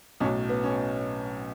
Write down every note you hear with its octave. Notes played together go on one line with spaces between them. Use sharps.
B1 A2 F#3 C#4
B3
C#4